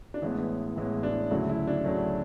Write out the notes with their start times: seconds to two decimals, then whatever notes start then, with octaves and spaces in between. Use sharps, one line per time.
0.14 D4
0.22 A1 A2 G#3 B3 E4
0.76 A1 A2 G#3 B3 E4
1.03 D4
1.31 D2 C#3 F#3 A3 E4
1.49 E4
1.67 D4
1.84 D2 C#3 F#3 A3